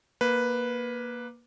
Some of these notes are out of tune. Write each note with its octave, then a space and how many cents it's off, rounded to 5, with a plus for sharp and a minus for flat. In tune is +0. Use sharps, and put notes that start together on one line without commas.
A#3 +15 B4 +0